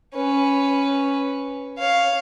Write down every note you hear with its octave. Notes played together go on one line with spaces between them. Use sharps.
C#4 B4
C#5 F5